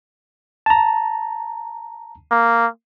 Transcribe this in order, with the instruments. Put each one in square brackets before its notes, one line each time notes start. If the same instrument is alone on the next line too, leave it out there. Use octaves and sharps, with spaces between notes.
[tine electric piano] A5 A#5
[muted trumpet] A#3